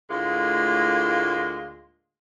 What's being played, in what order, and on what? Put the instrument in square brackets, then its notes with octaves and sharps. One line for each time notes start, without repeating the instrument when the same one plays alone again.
[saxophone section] D2 A2 G#3 A#3 F4